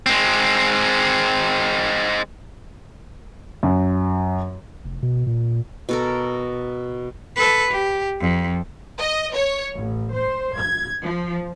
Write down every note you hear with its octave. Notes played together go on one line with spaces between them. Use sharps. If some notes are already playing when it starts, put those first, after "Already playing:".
G#3 C4
F#2
F1
B2
A#2
B2 A4 A#4
A4 B4
G4
F2
D#5
C#5
A1
C5
G#6
F3